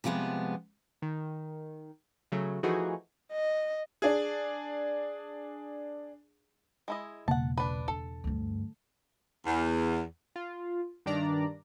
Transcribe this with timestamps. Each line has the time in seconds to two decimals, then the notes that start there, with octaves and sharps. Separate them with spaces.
0.04 C3 F3 G3 G#3 B3
1.02 D#3
2.32 C#3 F#3 A3
2.63 E3 F3 A3 D#4 F#4 G#4
3.32 D#5
4.02 D4 G#4
6.88 G#3 E4 D#5
7.28 E1 B1 C#3 A#3 F#5 A5
7.57 D4 B4
7.88 D4 A4
8.24 D2 G2
9.46 E2
10.36 F4
11.06 G2 D#3 D4 D5 A#5